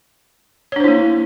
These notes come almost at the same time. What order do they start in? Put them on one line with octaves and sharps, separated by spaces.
C#5 D4 C5 E4 A#3